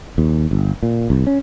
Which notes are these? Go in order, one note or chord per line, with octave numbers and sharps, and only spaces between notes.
D#2
G1
A#2
C2
C#4